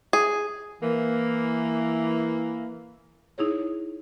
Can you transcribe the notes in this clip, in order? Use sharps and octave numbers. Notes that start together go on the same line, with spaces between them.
G#4
E3 A#3
D#4 E4 G#4 C#5